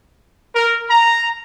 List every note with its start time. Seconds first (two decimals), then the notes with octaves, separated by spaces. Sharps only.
0.55 A#4
0.90 A#5